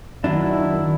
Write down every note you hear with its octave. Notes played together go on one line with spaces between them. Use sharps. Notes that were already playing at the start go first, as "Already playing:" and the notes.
F#1 D#3 F#3 D4 E4